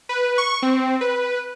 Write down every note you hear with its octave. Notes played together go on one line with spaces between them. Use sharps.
B4
C#6
C4
B4